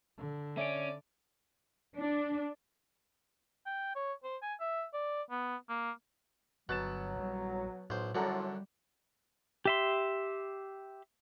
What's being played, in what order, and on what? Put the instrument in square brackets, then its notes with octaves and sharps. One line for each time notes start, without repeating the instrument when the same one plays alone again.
[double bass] D3
[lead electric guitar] C#4 [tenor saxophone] D5 [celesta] E5 D7
[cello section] D4
[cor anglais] G5
C#5
C5
G#5
E5
D5
B3
A#3
[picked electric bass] G1 [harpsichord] B2 [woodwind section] F#3 [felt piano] F#6 A6 E7
[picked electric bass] A#1 G3
[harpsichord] B1 C5 [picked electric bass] A2
[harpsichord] F#2 D3 [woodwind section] A2 F4 [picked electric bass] G3 [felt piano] F#4 A4 A#5
[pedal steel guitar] G4 E5 C6